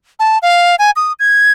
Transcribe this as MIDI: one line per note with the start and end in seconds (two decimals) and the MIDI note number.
0.19 0.38 81
0.42 0.75 77
0.79 0.91 80
0.96 1.13 87
1.19 1.52 92